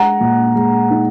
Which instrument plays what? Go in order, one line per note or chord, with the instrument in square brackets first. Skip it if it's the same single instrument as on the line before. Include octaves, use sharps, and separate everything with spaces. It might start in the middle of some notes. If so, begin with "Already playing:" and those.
Already playing: [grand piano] G#3 F#5 A#5
A#2
G#3
D#4